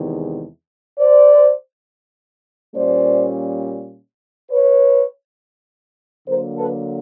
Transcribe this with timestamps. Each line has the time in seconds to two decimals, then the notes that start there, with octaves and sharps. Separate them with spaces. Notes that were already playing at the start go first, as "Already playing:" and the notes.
Already playing: E2 C3 D#3 G#3
0.99 C5 D5
2.75 A#2 G3 A#3 C#4 C5 D5
4.51 B4 C#5
6.28 D3 F#3 A#3 A#4 C5
6.57 A4 B4